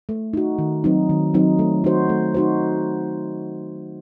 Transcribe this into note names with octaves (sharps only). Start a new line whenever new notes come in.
A3
D#4 F#4
D#3
F#3 C4 D#4
D#3
F#3 C4 D#4
A3
D#4 F#4 C5
A3
D#4 F#4 C5